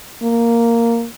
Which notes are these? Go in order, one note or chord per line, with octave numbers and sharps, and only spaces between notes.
A#3